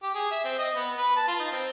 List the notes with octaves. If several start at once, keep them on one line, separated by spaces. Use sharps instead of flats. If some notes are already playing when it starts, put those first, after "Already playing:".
G4
G#4
E5
C4
D#5
B3
B4
A5
F4
D#4
C4